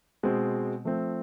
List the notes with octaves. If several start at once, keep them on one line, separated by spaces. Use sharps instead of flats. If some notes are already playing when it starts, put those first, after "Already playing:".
B2 G#3 C4
F3 A3 C4